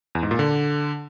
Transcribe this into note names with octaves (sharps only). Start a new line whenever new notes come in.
E2
G#2
A#2
D3